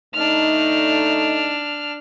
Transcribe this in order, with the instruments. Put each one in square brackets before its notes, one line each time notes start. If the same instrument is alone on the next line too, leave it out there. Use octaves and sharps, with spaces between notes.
[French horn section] D3 A3 D#4 [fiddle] D4 F6